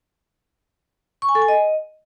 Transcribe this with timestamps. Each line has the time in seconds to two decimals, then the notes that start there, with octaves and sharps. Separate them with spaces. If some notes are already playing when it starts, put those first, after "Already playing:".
1.22 C#6
1.29 G#5
1.35 A4
1.42 G#5
1.48 D#5